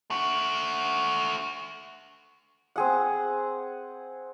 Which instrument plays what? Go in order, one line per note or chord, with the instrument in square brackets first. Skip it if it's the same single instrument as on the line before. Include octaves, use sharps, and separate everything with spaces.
[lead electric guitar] A3 F#4
[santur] C4 G#4 F#5